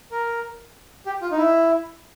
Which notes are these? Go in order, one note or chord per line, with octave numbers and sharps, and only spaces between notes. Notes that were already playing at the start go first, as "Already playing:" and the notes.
A#4
G4
F4
D#4
E4